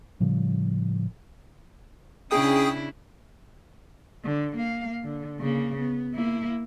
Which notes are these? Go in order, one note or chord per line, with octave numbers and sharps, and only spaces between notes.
A2 C#3 F3 G3
C#3 C#4 D4 E4 G#4 G5 D#6
D3
A#3 F5
D3
C#3 A#3
B3
A#3 E4